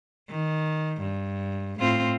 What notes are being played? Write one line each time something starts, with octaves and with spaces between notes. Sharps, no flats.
D#3
G2
A2 C4 F4